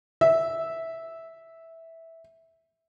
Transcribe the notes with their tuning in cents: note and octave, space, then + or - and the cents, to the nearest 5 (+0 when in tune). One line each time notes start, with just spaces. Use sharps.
E5 -10